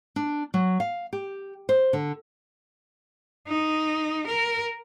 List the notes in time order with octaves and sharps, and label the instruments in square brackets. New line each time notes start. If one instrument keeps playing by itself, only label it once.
[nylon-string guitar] D4
F#3
F5
G4
C5
D3
[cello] D#4
A#4